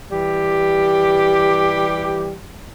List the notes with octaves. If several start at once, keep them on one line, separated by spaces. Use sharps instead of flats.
E3 G3 G4